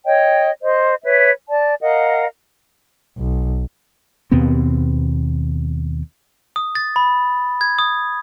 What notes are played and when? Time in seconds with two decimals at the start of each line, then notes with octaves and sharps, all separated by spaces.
0.06 C#5 D#5 G5
0.62 C5 D#5
1.03 B4 C#5 E5
1.49 D5 A5
1.81 A#4 D#5 F5 F#5
3.18 B1
4.31 D#2 B2 B3 C4
6.56 D#6
6.75 A6
6.96 B5
7.61 G#6
7.79 D#6